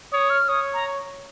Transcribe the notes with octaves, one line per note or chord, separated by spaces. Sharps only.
C#5 D#6
F6
C#5 D#6
A#5